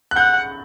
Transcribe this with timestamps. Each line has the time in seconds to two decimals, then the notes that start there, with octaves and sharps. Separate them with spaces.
0.11 F#6
0.16 F#5 G6